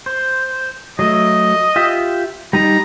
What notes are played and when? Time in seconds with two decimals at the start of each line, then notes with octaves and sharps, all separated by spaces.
0.06 C5
0.99 F#3 A3 D#5
1.76 F4 G4 E5
2.53 G3 D#4 A#5